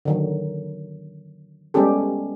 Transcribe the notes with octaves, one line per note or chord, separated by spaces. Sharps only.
D3 D#3 F#3
G3 G#3 B3 C#4 G4 A4